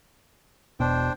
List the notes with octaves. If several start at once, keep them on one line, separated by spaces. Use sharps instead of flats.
E1 B2 D4 C5 G5